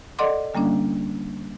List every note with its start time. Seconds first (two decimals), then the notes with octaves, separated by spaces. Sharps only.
0.19 A4 D5 D#5 F#5 C6 D6
0.54 D3 G3 A#3 C#4 D4